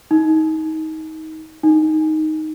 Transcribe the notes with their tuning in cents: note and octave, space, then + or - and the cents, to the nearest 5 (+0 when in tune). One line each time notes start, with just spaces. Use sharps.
D#4 +25
D#4 +5